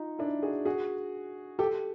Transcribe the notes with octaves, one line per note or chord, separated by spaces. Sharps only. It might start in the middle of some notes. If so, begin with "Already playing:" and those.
Already playing: D#4 F4
D4 E4
F#4 G#4
F#4 G#4
G4 A4